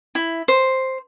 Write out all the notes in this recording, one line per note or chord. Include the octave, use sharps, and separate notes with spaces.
E4
C5